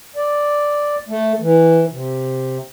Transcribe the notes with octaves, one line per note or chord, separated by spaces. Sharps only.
D5
A3
E3
C3